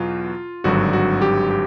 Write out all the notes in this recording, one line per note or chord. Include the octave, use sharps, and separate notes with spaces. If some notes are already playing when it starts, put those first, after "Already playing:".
Already playing: E2 B2 F#3 F4
G#1 G2 D3 F#3 F#4
F#4
G4
G4